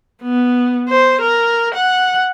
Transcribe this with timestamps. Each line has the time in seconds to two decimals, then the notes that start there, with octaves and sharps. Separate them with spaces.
0.22 B3
0.89 C5
1.21 A#4
1.74 F#5